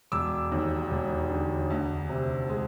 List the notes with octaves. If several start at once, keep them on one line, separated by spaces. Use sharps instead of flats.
E1 D6 E6
D#2
E1
D3
D2
C3
G#3